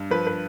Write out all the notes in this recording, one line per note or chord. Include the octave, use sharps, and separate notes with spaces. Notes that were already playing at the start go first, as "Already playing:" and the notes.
Already playing: G2
F3 B4
B4